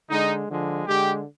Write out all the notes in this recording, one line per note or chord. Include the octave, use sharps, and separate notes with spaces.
D3 G#3 D#4
D3 F3 G#3
D3 G#3 G4